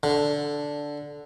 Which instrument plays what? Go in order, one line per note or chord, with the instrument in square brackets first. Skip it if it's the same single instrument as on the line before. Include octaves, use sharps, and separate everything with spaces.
[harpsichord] D3